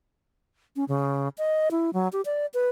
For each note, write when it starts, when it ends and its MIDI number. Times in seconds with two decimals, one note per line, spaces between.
0.76 0.85 61
0.88 1.28 49
1.38 1.69 75
1.71 1.90 64
1.93 2.08 54
2.13 2.21 67
2.26 2.46 74
2.54 2.70 71